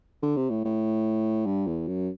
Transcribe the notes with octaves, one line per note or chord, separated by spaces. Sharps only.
D3
C3
A2
A2
G2
E2
F#2